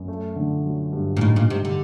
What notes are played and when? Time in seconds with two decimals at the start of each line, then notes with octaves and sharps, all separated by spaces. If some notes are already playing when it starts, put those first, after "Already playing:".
Already playing: F#2
0.08 A3
0.36 D3
0.65 F#3
0.93 G2
1.17 A#2
1.21 A2 D#4
1.36 A#2
1.49 C3 G3
1.65 D3